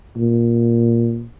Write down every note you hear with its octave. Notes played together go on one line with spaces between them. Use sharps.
A#2